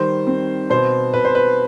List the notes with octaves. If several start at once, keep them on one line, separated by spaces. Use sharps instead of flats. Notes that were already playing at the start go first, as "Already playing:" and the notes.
Already playing: D#3 G3 C5
C4
B2 C5
B2 B4
C5
B4